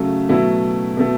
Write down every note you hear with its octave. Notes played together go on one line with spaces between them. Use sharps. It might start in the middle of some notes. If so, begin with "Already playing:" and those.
Already playing: C#3 F#3 A3
B2 F#3 A3 E4
B2 A3